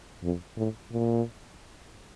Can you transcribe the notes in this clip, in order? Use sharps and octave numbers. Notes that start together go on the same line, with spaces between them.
F2
A2
A#2